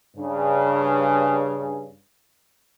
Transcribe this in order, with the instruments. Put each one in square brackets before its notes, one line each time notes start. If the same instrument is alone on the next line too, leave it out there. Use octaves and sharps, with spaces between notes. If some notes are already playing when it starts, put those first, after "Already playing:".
[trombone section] G2 C#3